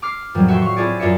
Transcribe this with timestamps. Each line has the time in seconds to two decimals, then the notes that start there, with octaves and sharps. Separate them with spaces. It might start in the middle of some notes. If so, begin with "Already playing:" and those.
0.02 D6 F6 C7
0.35 F2 A2 D#3 F#3 G3
0.48 F#4 E5 G5 C6
0.62 F5 C#6
0.77 C4 E4 F4 G#4 D5
1.00 F#2 F4 A#4 D5 E5 C#7